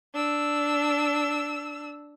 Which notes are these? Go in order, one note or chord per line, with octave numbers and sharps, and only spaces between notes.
D4 E6